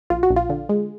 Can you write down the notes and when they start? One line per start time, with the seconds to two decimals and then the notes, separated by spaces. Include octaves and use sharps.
0.10 A#1 F4
0.23 F#4
0.30 A#1
0.36 F4
0.50 D3
0.69 G#3